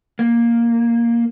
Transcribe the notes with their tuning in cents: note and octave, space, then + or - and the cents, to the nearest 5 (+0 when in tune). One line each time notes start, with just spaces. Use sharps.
A#3 +5